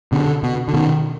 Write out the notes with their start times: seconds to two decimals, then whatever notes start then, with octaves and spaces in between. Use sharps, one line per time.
0.12 B2 D3
0.43 B2
0.68 D3
0.74 B2 D#3